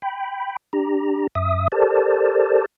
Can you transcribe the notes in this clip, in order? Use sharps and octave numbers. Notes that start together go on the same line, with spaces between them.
G5 B5
D4 G4 A#5
F#2 E5 D#6
G4 A4 A#4 C5 D5 A5